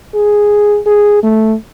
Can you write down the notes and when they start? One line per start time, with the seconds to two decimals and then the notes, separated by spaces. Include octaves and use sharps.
0.15 G#4
0.86 G#4
1.23 A3